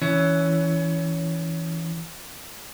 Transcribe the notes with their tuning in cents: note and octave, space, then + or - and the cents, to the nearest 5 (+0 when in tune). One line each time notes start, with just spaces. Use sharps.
E3 +0 C#4 +20